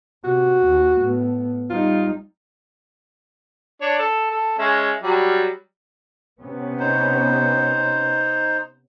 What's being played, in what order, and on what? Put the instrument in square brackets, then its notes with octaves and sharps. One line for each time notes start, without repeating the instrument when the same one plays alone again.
[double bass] C3 [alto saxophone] F#4
[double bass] D#2
A2 B3
[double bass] G3 D#4 [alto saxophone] F4
[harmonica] D4 C#5
A4
A4
G#3 C#4 E5
F#3 G3
[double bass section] C3 B3 C#4
[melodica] D#4 C5